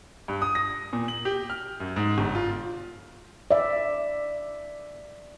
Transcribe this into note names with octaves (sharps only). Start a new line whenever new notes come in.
G2
D#6
A#6
A#2
F#7
G4
F6
F#2
G#2
G1
F4
D5 E5